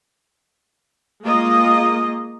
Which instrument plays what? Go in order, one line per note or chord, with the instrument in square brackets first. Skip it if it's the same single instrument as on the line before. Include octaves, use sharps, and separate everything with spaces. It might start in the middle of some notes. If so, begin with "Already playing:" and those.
[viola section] G#3 A#3 F4 D#5